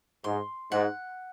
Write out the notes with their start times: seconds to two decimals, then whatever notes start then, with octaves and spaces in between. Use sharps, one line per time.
0.24 G#2 C6
0.71 G#2 F#5